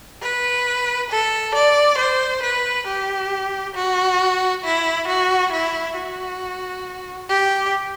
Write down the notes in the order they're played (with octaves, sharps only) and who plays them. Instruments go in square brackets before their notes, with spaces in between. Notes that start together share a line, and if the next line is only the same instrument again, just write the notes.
[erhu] B4
A4
D5
C5
B4
G4
F#4
E4
F#4
E4
F#4
G4